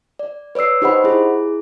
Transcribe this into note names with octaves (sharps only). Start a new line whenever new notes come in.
D5
B4 C#5 D5 E6 C7
D#4 G4 C5 D#5 F#5 B5
E4 G#4